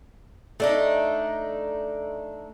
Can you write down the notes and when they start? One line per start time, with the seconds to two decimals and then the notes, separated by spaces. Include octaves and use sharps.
0.60 A3 D4 D#4